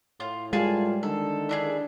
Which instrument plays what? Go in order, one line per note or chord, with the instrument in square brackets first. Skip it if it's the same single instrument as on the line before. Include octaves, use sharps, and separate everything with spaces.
[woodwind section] A2 [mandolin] F4
[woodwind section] A2 A#3 F4 [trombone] G3 [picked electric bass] G#3 [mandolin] G#4 G#5 A5
[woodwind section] D3 D#3 [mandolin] A4
[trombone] D4 [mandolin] E4 F#4 G#4